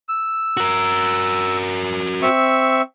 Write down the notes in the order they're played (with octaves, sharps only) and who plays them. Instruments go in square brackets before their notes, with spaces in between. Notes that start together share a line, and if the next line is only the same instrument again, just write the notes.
[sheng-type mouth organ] E6
[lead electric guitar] F#4 A#4
[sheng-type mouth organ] C4 E5 C#6